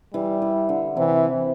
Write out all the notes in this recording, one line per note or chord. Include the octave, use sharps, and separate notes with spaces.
E3 G3
E3
D3
C3 E3